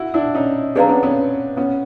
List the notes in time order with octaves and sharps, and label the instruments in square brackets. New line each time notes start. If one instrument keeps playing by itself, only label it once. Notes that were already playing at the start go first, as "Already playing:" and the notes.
Already playing: [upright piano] E4 F#4
D4 E4
C#4 D#4
[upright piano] C4 D4 [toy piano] G#4 B4 D5 F5 A#5
[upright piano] B3 C#4
B3 C#4
B3 C#4